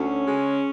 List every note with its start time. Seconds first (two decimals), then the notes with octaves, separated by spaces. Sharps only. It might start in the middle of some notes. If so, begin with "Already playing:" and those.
Already playing: D2 C#4
0.25 C#3 G#3